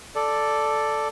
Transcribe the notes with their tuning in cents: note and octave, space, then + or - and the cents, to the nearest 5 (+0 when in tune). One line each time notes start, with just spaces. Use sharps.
A4 +0 D5 +0